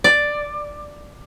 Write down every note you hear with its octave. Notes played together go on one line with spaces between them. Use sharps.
D5